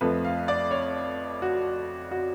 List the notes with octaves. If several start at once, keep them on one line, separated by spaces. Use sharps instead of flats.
F2 F3 A3 B4
F5
D5
C#5
F#4
F#4